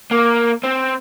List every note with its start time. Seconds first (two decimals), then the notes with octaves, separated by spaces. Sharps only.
0.11 A#3
0.64 C4